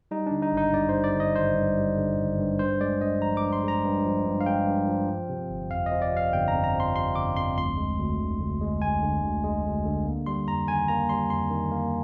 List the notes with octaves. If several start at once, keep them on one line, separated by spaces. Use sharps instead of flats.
G3 D#4
D3 D4
D#4
G#1
D#4
G2 D5
C5
G3
D5
D3
D#5
G#1 C5
G2
G3
D3
G#1
G2
G2 C5
G#3 D5
G2 D#5
F3 A#5
D6
G2
C6
G#3 A#5
G2
F3
G2
F5
G#3 G5
G2
F3
F3
C3
G1
F2 F5
D#5
F3
D5
C3 F5
G1 G5
A#5
F2
A#5
F3
C6
C3 C6
G1 D6
F2 C6
D2 C6
G#3
D2
D3
D2
G#3
D2 G#5
D3
D2
G#3
D2
D3
A#3
G3 C6
F2 A#5
D#3 G#5
A#3 A#5
G3 C6
F2 C6
D#3
A#3